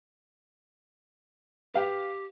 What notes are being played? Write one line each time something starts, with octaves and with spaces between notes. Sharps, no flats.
G4 B4 F5 G5